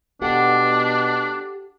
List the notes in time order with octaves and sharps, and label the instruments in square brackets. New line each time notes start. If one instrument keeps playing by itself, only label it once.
[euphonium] B2 [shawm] D4 [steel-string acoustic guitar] G4 A4 F#5